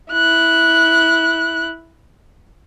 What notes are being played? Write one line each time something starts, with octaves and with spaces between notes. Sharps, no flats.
E4 F#6